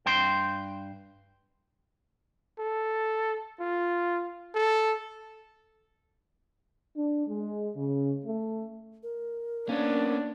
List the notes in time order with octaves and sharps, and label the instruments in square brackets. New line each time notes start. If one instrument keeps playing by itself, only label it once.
[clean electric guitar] G2 G5 C6
[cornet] A4
F4
A4
[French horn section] D4
G#3
C#3
A3
[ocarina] A#4
[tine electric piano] A#3 [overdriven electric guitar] B3 C#4 [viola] D4